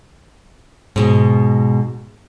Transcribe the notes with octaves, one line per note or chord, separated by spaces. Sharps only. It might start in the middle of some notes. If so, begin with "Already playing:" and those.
G#2 B2 G#3